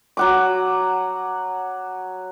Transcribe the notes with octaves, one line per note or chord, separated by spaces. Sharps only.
F#3 F#5 D6